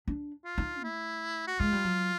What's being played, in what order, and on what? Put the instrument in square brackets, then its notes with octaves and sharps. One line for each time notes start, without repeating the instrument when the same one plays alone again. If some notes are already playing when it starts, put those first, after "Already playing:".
[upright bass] D4
[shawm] F4
[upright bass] D#4
[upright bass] A3 [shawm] E4
[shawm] F#4
[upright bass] G#3 [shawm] F4
[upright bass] G3
F#3